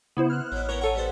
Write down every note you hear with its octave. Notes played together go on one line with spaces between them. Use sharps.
C#3 B3 E4 C5
F6 F#6
A1 B2 F#3
B3 C#4 A#4 C#5
A4 A#4 C#5 F#5 G#5
G3 B3 C5